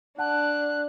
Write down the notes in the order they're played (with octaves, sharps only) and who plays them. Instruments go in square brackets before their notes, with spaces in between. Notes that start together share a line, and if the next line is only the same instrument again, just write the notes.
[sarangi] D4 [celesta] F#5 A5 [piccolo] F#6